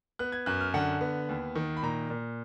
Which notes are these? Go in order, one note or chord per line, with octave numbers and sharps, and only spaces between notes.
B3 F#6
G#6
F#2 F#6
F6
D3 F#5
B3
D#2
D#3
B5
A#2 A#5
A#2